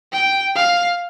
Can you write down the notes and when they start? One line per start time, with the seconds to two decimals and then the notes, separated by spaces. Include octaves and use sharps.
0.12 G5
0.55 F5